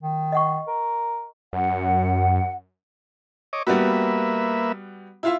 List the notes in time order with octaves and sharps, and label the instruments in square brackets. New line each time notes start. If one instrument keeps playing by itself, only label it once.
[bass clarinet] D#3
[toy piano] D#5 F#5 C#6
[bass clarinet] A#4
[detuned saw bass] F#2 [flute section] F#5
[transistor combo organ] C#5 D#5 D6
[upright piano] G3 B3 F#4 [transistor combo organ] A#3 B4 E5
[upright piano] E4 F4 E5